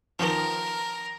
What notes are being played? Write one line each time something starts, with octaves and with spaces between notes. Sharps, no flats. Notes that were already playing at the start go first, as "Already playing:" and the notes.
D#3 F3 A#4